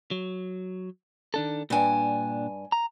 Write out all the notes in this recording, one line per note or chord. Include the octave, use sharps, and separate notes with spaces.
F#3
D#3 D4 A4
G2 A#2 D4 G5 G#5
A#5